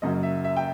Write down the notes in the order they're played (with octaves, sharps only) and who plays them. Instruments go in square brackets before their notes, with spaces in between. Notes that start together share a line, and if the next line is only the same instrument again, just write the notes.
[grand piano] F#1 F#2 C#3 F#3 D#5
E5
E5
G5